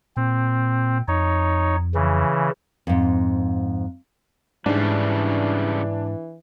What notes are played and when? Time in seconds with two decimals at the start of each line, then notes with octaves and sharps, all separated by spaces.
0.17 A#2 C4
1.08 F2 D#4 C#5
1.94 C#3 E3
2.87 F2 G#2
4.66 G#2 C#3 E3 G3 D4